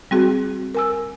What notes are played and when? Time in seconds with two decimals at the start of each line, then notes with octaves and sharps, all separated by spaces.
0.11 G3 C4 F#4 G#4
0.75 A#4 G#5 E6